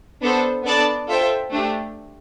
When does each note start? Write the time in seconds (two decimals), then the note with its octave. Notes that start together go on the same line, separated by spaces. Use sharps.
0.21 B3 D4 A4 C5
0.64 B3 D4 A4 D5 A5
1.08 F4 A4 C5 E5 G5
1.51 A3 D4 G4